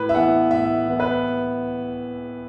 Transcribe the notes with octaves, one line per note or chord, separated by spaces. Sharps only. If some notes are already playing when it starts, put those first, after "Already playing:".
Already playing: A2 B4
E5
E3 B3 F#5
A2 E5
E3 B3
B4